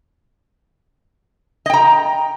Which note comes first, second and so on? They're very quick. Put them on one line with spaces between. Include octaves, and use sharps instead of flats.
D#5 G5 A#5